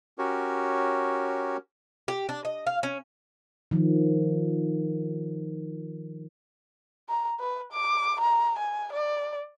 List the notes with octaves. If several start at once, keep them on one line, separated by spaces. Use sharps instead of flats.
C#4 F#4 G4 A#4 C#5
G4
D4
D#5
F5
C#4
D#3 F3
A#5
B4
D6
A#5
G#5
D5